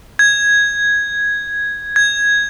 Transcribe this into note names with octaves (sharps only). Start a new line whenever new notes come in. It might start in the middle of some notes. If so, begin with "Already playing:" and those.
G#6
G#6